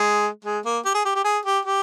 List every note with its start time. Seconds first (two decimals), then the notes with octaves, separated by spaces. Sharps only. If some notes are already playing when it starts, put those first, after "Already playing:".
Already playing: G#3
0.45 G#3
0.65 A#3
0.85 G4
0.94 G#4
1.05 G4
1.15 G4
1.24 G#4
1.45 G4
1.65 G4